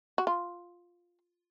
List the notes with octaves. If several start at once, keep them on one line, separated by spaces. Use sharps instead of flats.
F#4
F4